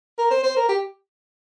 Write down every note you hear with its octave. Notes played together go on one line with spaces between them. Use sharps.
A#4
C5
C5
A#4
G4